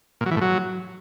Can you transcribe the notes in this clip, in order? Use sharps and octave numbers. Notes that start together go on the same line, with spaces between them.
A#2
F#3
E3
A2
F#3